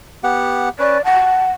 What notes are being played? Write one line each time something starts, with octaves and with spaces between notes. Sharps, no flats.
B3 G4 F#5
C#4 B4 D5
F#5 A5